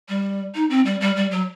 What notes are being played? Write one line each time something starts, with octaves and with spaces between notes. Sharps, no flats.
G3
D#4
C4
G3
G3
G3
F#3